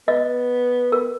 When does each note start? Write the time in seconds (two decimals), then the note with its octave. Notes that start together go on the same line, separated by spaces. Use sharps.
0.08 B3 D#5
0.92 A#4